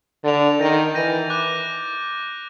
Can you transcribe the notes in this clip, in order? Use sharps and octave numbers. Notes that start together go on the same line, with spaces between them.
D3 A6 D7 F7
D#3 G6 A#6 D#7
E3 G6 A#6 D#7
D6 F#6